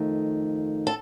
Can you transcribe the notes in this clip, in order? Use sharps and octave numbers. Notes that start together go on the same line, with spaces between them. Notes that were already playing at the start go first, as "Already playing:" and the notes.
Already playing: F2 D#3 A3
A4